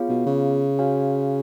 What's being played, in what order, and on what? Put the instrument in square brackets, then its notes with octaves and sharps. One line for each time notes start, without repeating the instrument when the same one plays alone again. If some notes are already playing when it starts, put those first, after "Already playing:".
Already playing: [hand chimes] B3 F4 G#4 C#5 F5
[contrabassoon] B2
C#3
[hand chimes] F#4 C#5 F5 G#5